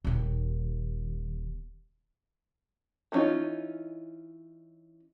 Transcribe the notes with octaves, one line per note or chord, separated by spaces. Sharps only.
D#1 D#2
E3 B3 C#4 D#4 F4